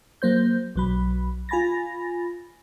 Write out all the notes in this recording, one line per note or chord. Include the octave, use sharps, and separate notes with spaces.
F#3 A#3 C5 G6
B1 F#3 B5
F4 G#5 B5 A6 A#6